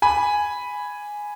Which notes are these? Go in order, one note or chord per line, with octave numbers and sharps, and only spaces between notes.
G#5 B5